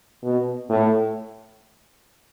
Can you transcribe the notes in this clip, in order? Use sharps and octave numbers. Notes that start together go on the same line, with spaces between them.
B2
A2